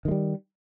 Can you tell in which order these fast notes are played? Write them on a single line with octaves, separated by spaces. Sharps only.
D#3 G#3 G3